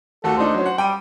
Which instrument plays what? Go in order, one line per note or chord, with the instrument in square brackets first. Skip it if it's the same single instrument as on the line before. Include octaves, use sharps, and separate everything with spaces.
[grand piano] D#2 A3 F#4 [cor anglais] A4
[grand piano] A3 D4 D#4 [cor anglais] C5
[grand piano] F#3 C#4
F#5
[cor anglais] G3 [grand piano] G5 D#7